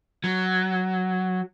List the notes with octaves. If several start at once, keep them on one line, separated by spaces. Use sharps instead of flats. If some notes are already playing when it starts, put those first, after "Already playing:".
F#3